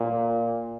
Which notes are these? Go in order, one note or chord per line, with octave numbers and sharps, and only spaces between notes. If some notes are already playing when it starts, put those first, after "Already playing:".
Already playing: A#2